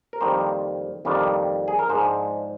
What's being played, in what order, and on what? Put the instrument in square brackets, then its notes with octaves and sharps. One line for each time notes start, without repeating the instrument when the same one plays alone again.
[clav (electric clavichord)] A#4
F2 D#3 G3 A#3 D4 C5
F2 D#3 G3 A#3 D4
G#4
A#4
G#2 F3 G#3 D4 C5